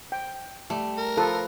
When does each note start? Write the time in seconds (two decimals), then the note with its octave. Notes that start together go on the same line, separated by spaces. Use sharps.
0.12 G5
0.70 G3 A3
0.98 A#4
1.17 F3 A4 B4